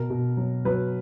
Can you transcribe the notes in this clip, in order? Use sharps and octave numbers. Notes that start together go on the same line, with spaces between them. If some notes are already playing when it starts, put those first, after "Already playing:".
Already playing: B2 A#4
B2
F#3
F#3 B4